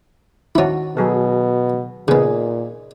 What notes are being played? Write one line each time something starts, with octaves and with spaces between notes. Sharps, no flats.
D#3 C#4 E4 F#4
B2 F#3 G#4 A4
A#2 C#3 B3 D#4 G#4